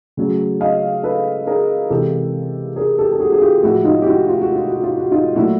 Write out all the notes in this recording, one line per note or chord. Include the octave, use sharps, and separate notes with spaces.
C#3 F#3 A3
D#5 F5
A4 B4
G#4 A#4
C3 E3 G#3 G4 A4
G#4 A#4
G4 A4
A4
F#4 G#4
G#4
F4 G4
A2 F3 G#3 E4 F#4
D#4 F4
G4
E4 F#4
F4
F#4
F4
F#4
F4
F#4
D#4 F4
A#2 F#3 A3 E4 F#4